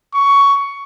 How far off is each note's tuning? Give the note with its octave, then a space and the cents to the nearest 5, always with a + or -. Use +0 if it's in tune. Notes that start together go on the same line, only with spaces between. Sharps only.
C#6 +15